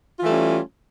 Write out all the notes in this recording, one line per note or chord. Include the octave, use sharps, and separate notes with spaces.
E3 G3 A3 C#4 F4